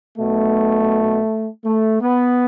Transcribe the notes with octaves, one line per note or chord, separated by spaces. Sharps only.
B1 B2 A3
A3
B3